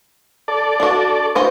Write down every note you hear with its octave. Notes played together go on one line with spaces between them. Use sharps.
A4 D5
D4 F#4
E3 F#4 C5